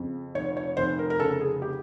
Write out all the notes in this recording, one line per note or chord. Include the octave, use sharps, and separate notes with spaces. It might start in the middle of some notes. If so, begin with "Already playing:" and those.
Already playing: F2 C#3
F1 C#5
C#5
F1 C5
A#4
A#4
C#3 A4
G#4
G4